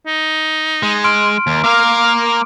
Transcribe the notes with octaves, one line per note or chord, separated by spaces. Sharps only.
D#4
G#3
C6 F6 D7
D#2
A#3 A#4 F5 D6